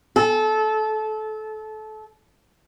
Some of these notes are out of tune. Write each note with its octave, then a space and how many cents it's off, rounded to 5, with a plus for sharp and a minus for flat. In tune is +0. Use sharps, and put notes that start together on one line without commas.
A4 -25